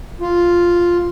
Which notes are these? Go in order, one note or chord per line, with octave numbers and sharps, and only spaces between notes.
F4